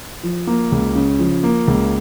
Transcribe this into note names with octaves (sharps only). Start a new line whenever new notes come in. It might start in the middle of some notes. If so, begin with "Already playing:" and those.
F3
A#3
C#2
C#3
F3
A#3
C#2